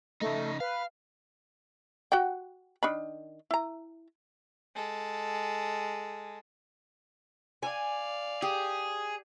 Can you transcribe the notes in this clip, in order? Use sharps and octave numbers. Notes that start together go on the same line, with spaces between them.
C#3 A3 D#4
B4 F5
F#4 F#5 G5
D#3 D4 B5
E4 A#5
G#3 A4
D5 F5 G#5
G4 G#4